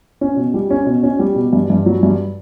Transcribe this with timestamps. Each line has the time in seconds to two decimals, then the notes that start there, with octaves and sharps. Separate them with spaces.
0.21 C#4
0.37 B2
0.54 G3
0.70 C#4
0.86 B2
1.03 C#4
1.19 G3
1.36 B2
1.53 G2
1.70 G2
1.86 F#3
2.03 G2